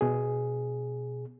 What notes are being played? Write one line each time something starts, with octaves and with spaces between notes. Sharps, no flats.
B2 G#4